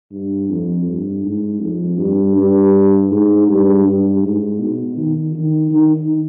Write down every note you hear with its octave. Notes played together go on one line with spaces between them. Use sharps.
G2
F2
G2
G#2
F2
G2
G2
G#2
G2
G2
G#2
B2
D#3
D#3
D#3